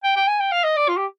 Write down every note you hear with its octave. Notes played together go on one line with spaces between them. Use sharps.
G5
G5
G#5
G5
F5
D#5
D5
F4
G4